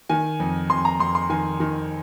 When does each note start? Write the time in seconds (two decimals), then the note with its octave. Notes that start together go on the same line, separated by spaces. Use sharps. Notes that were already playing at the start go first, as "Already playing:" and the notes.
0.09 D#3 G#5
0.40 F2
0.70 F2 C6
0.85 A#5
0.99 F2 C6
1.15 C6
1.30 D#3 G#5
1.60 D#3